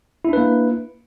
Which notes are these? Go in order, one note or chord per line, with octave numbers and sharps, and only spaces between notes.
A#3 D4 E4 B4